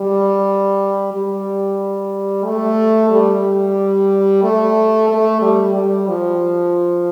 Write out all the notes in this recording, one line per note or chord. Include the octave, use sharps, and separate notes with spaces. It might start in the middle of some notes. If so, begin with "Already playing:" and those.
Already playing: G3
G3
A3
G3
A3
A3
G3
G3
F3